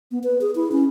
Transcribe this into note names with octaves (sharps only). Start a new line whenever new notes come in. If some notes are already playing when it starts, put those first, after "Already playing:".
B3
B4
G#4
E4
C#4